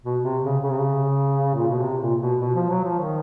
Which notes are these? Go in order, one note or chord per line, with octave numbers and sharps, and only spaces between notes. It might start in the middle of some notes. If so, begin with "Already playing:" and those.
B2
C3
C#3
C#3
C3
C#3
A#2
B2
C3
A#2
B2
B2
F3
F#3
F3
D#3